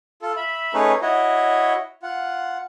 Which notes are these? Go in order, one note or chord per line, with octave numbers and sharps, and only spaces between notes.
F4 A4
E5 B5
A3 C#4 D#4 G#4 B4 C#5
E4 F#4 C#5 D#5
F4 F#5